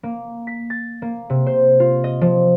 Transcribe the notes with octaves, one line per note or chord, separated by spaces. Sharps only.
A#3
B6
A6
A#3
C3
C5
F4
D#5
F3